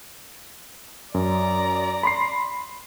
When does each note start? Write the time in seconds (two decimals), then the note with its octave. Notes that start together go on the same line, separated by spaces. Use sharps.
1.14 F#2 D5 A#5
2.03 B5 C6 C7